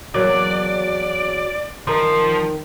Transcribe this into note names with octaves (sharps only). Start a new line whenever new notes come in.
E2 F#3 A#3 D5
D#3 F3 A#4